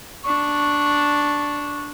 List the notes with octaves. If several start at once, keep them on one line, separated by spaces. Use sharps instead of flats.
D4 C#6